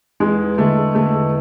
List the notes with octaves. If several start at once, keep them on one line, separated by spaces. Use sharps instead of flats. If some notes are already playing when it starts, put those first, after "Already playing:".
E2 G#3
D3 G#3 A3 D4
E2 A3